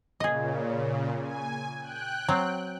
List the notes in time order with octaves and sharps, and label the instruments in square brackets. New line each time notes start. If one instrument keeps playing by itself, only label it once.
[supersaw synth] A#2 C#3 [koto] G#4 D#5
[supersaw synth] G#5
G5 F#6
[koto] F#3 C4